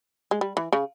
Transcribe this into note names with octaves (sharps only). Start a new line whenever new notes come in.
G#3
G3
E3
C#3